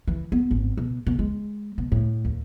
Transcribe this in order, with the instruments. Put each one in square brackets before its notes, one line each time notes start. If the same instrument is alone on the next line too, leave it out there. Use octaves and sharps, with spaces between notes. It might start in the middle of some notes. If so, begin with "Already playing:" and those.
[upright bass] E3
B3
G#1
B2
B2
G#3
B2
A2
D#2